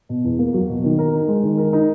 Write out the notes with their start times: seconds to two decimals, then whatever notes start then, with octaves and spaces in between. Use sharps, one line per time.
0.09 B2
0.24 E2
0.39 A#3
0.54 F#3
0.69 B2
0.84 D#3
0.99 A#4
1.13 D#4
1.28 G#3
1.43 D#3
1.58 A#4
1.73 D#4